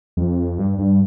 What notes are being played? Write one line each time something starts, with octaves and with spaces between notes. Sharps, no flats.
F2
G2
G2